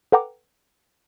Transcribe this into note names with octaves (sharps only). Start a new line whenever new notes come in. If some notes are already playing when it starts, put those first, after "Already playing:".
A4 B4 F#5 G5 A#5 D6